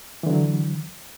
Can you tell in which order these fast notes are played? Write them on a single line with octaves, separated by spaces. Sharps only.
E3 D3 F#3